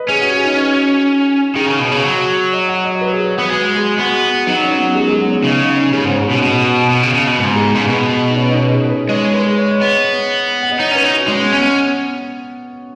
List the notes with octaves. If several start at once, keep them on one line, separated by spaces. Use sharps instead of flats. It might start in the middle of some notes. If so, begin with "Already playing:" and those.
Already playing: B4 D#5
C#4 G#4
F#4
G#4
D#4
F#4
D#3 G#4
C#3
B2
C#3
F#3
D#5
F#5
D#5
B4
G#4
F#4
B3 F#4
G#3 F#4
G#4
B3 F#4
F#3 D#4
C#4
B3
G#3
G#3
B3
C#4
C#3 D#4
D#4
C#4
C#3 G#3
G#2 B3
C#4
B2 G#3
B2 B3
B2
C#3
C#3
B2
G#2 B3
G#3
C#3
B2 B3
D#4
C#4
D#4
G#4
B4
G#3 C#5
B4
G#4
C#5
D#5
B3
F#5
D#5
D#4 C#5
C#4 B4
D#4
F#4
G#3 C#4
B3
C#4
B3